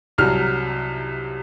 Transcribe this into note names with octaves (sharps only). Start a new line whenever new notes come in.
C2 C3 F#3 F6